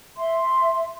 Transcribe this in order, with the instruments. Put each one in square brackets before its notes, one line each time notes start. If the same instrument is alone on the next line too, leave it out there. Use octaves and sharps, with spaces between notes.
[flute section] E5 C6